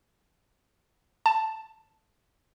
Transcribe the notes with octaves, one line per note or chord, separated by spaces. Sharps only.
A5